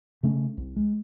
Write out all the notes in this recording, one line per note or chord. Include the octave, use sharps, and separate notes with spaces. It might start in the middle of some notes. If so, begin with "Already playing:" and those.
C#3 A3 C#4
C2
G#3